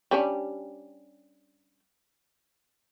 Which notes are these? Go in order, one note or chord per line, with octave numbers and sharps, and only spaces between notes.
G3 C#4 D4